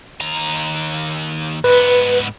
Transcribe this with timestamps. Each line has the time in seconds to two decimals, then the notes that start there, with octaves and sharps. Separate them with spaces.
0.21 D#2 A#5
1.64 G#2 B3 B4